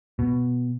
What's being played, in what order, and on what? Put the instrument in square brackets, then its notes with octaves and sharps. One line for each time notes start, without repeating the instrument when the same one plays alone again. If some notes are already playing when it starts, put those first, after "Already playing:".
[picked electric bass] B2